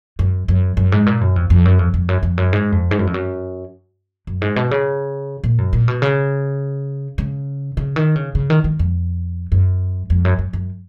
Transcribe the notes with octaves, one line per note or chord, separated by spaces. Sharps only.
F#2
F#2
F#2
G#2
A#2
F#2
F2
F2
F#2
F2
F2
F#2
F2
F#2
G#2
F2
G#2
F#2
F2
F#2
F#2
G#2
B2
C#3
A#2
F#2
A#2
B2
C#3
C#3
C#3
D#3
C#3
C#3
D#3
D#3
F2
F#2
F2
F#2
F#2
F#2